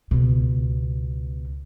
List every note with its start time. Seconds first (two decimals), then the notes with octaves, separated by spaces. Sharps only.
0.11 C#2 B2